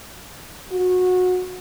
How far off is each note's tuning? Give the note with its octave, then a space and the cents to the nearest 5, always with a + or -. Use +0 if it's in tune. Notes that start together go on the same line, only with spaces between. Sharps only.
F#4 -25